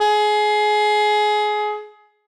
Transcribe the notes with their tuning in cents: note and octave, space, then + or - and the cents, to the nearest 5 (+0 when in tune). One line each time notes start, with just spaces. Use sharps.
G#4 +20